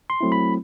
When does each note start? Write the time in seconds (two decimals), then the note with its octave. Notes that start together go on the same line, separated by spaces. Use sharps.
0.10 C6
0.21 F#3 A3 C4 E4
0.32 B5